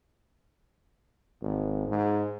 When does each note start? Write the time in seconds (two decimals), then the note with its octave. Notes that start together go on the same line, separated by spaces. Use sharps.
1.41 G#1
1.88 G#2